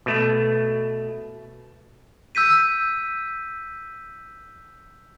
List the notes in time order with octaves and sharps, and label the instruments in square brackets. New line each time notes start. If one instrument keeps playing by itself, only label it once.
[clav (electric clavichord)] B2 A3
[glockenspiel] E6 G6 B6 D#7